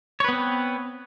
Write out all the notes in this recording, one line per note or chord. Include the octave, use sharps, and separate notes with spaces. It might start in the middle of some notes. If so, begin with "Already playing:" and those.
B3 C4 B4 C#5